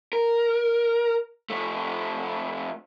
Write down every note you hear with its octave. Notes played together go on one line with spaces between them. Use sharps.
A#4
F2 A3